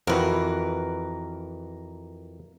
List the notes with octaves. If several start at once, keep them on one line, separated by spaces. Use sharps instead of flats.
F2 E3 F#4 A#4 B4